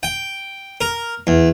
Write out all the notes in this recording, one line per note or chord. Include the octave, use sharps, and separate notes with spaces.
G5
A#4
E2